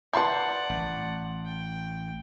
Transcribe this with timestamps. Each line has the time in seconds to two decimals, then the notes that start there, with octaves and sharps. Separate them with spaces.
0.13 E4 B4 D5 F#5 A5 C6 G6
0.70 A1
1.45 G5